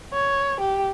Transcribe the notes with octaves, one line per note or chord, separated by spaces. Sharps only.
C#5
G4